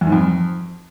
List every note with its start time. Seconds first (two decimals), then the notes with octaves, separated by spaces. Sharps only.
0.01 E2
0.07 G#2
0.12 F2